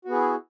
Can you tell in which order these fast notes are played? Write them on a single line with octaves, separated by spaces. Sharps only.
F#4 B3 G#4 E4